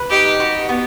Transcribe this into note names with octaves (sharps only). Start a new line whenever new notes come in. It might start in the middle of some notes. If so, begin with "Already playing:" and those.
Already playing: B4
D#4 G4
F#4
B3